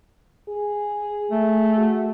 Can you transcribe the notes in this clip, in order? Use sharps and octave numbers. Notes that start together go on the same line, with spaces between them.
G#4
A3
F#4